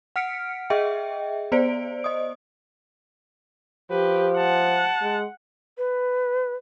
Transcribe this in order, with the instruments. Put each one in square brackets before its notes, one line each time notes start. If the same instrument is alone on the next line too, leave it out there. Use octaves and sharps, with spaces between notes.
[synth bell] F#5 F6 B6 C#7 D7
G#4 D#5 E5 G5
B3 C5 D5 D7
D#5 D#6
[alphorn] F3 [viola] G4 [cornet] B4
[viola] F#5 [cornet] A5
[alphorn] G#3
[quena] B4